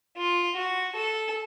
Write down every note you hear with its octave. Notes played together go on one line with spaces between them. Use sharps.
F4
F#4
A4